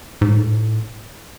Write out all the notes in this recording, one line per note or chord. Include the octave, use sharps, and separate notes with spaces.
G#2
A2